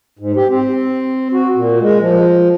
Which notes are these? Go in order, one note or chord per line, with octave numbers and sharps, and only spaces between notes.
G#2
G4
C4
F#4
A#2
G#3
F3